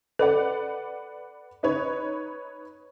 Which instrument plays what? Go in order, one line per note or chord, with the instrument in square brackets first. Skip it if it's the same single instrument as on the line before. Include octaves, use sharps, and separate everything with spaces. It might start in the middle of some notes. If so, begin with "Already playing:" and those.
[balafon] A4 [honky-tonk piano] B4 D5 F#5
[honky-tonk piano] D#4 B4 C#5